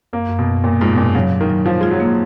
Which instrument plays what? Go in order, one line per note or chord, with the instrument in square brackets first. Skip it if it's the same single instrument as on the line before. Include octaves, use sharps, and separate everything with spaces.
[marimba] F#2 [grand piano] A#3
[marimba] F#2
[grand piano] B2
[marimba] F#2
[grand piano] A#2 [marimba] A#3
[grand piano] G#2 [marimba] F4
[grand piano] B2
[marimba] F#2 [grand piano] A#2
[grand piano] C#3 [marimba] F#3
[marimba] F#3
[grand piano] D#3
[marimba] F#3
[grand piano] F3 [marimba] F4
[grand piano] G#3 [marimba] F4
[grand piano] F#3
[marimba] A#3